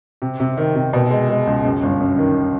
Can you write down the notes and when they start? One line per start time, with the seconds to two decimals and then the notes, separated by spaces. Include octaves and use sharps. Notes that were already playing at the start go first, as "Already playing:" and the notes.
0.22 C3
0.40 C3
0.57 D#3
0.75 C3
0.93 B2
1.11 G#3
1.29 G#3
1.47 C#2
1.64 F#2
1.83 G1
2.00 F#2
2.18 D#3